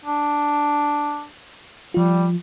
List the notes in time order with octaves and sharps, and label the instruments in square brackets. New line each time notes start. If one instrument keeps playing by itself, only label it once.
[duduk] D4
[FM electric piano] F3 F4 [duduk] G3